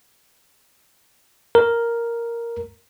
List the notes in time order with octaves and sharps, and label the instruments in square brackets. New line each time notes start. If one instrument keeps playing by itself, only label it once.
[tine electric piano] A#4